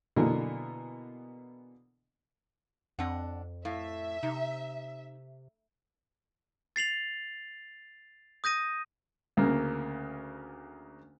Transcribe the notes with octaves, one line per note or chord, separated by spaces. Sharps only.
B2 D3 E3 A#3 B3
F2 C4 D4 F#5
A2 E5 F5
C3 D#4
A6 C7 F7 F#7
D#6 G6 A#6 D#7
D2 C#3 A#3